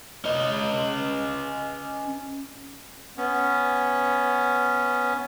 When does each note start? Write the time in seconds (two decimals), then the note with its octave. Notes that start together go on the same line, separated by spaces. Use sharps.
0.25 C#4 D#5
3.17 B3 C#4